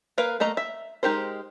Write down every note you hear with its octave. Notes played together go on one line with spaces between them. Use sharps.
A#3 A#4 B4 F5
A3 A#3 D#5 A#5
E5
G#3 D#4 G4 A#4 C5